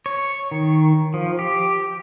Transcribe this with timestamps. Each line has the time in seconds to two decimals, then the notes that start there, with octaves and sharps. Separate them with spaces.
0.06 C#5
0.51 D#3
1.14 F3
1.39 G4